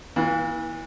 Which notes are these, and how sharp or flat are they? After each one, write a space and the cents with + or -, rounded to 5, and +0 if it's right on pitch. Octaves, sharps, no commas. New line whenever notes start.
E3 -25 A#3 +45 F4 +0